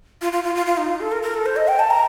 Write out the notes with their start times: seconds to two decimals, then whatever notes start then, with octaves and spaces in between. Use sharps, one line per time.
0.22 F4
0.33 F4
0.44 F4
0.55 F4
0.66 F4
0.77 D#4
0.89 F4
1.00 A4
1.12 A#4
1.23 A#4
1.34 A4
1.46 C5
1.56 D#5
1.68 G5
1.79 A5
1.90 A#5